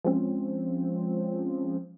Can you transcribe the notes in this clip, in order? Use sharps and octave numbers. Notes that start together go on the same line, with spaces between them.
F3 G#3 C4 C#4